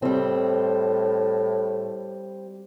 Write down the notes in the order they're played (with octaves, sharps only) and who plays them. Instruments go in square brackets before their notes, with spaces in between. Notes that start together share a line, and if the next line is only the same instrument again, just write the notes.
[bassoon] A2 [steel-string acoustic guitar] G3 C4